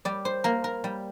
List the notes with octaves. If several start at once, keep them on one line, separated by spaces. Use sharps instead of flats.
G3 D5
C5
A#3 A#4
A#4
G3